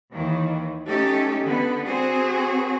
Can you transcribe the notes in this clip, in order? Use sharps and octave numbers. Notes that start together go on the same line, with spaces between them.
D#2 D#3 E3
A3 C#4 D#4 G4 A4
D3 B3
C4 F#4 G#4 C5